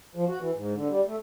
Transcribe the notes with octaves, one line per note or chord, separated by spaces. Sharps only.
F3
F#4
E3
G#2
D3
G3
A3